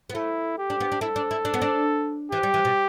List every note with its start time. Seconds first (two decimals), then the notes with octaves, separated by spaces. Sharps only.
0.10 B3
0.15 A3 E4
0.58 G4
0.70 D4
0.80 B3
0.92 D4
1.01 E4 A4
1.16 D4
1.31 E4
1.45 D4
1.54 B3
1.62 D4
2.32 E3 G4
2.43 G3
2.54 E3
2.65 B2